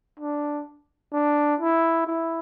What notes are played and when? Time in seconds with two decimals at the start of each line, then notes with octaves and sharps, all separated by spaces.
0.20 D4
1.13 D4
1.60 E4
2.07 E4